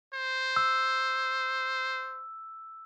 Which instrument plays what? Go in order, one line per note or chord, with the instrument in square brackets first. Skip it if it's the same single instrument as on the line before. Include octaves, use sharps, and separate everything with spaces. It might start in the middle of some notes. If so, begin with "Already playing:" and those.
[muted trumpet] C5
[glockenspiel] E6